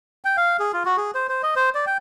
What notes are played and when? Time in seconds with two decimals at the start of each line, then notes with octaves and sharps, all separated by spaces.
0.25 G5
0.37 F5
0.59 G#4
0.73 F4
0.85 F#4
0.97 G#4
1.15 C5
1.29 C5
1.43 D#5
1.56 C5
1.75 D5
1.86 G5